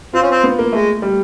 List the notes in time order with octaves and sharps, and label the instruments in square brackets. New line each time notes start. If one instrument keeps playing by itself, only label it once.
[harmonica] C4 [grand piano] F4
[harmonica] C#4
C4
[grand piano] B3
A#3
[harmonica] G#3 [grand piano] A3
[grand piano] G3